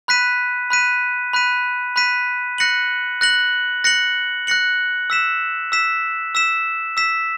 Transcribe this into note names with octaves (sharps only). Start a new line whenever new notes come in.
B5 F#6 B6 D#7
B5 F#6 B6 D#7
B5 F#6 B6 D#7
B5 F#6 B6 D#7
F#6 A#6 C#7 F#7
F#6 A#6 C#7 F#7
F#6 A#6 C#7 F#7
F#6 A#6 C#7 F#7
E6 B6 E7
E6 B6 E7
E6 B6 E7
E6 B6 E7